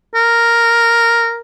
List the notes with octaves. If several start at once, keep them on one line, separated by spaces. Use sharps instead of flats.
A#4